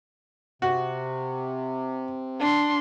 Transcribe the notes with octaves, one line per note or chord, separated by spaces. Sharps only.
C3 F#4
D4 C6